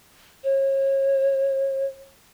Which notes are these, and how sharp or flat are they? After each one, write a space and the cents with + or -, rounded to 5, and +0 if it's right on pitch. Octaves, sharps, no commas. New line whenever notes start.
C#5 -35